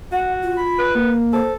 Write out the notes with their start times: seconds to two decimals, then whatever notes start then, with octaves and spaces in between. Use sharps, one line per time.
0.12 F#4 F#5
0.43 F4
0.56 B5
0.79 B4
0.95 A#3
1.33 A4 C5